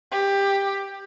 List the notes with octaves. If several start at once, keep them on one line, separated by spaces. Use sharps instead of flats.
G4